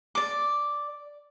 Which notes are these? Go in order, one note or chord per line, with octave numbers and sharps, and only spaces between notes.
D5 D6